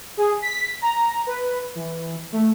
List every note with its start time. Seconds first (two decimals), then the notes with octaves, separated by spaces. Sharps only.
0.17 G#4
0.42 B6
0.81 A#5
1.27 B4
1.75 E3
2.32 A3